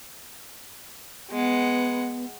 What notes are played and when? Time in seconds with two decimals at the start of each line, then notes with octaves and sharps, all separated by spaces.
1.31 G#3 B3 F#5